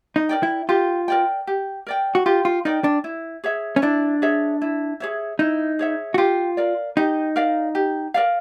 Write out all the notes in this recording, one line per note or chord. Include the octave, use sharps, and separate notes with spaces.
D#4
A#4 D5 G5
E4
F4 G4
A#4 D5 G5
G4
A#4 D5 G5
F#4
F4 G4
F4
D#4 A#4 D5 G5
D4
E4
G#4 C#5 E5
C#4
D4 E4
G#4 C#5 E5
E4
G#4 C#5 E5
D#4 E4
G#4 C#5 E5
F#4
F4 G4
A#4 D5 F5
D#4 G4
A#4 D5 F5
G4
A#4 D5 F5